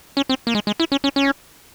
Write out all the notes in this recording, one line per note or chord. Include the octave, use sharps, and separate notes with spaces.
C#4
C4
A#3
G#3
G#3
E4
C#4
C#4
C#4